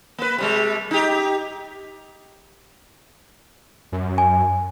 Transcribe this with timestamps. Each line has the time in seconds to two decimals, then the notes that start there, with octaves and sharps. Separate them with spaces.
0.18 A#3 B4
0.38 C3 G3 G#3
0.91 D#4 G4
3.92 F#2
4.18 G#5